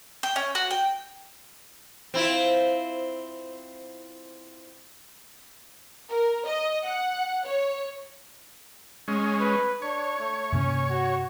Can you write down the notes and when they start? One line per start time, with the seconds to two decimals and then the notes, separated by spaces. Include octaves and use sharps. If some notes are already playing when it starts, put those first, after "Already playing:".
0.23 G5
0.36 C#4
0.55 F#4
0.71 G5
2.14 C4 E4 F4
6.10 A#4
6.46 D#5
6.85 F#5
7.46 C#5
9.08 G#3 C#4
9.40 B4
9.82 D4 C#5
10.19 A3
10.52 G2 C3 A#3 C#4
10.90 F#4